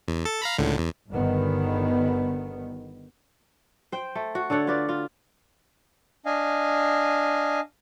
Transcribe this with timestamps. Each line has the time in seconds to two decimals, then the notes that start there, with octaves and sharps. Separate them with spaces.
0.08 E2
0.25 A4 A6
0.42 F5 A#5 B5
0.58 C#2 A2 D3
0.78 E2
1.10 G1 D3 D#3 B3
3.92 C5 G5
4.15 A3
4.35 F#4
4.50 D3 A4 C#5 F#5
4.67 F4 F#4 B4 D5
4.89 F4
6.26 D4 D#5 F5 G#5